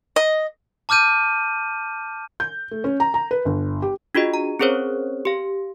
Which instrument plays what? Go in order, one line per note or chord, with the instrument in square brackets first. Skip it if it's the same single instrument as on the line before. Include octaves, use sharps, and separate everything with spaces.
[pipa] D#5
[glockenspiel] A5 D6 F6 G6 D#7
[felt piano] G6
A3
C#4
A#5
A#5
B4
G1
G4
[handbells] D4 F4 F#4 G#4 D#5
A#5
C4 C#4 G#4 A#4 C5 C#5
G4 F5